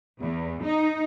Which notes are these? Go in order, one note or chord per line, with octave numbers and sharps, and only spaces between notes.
E2
D#4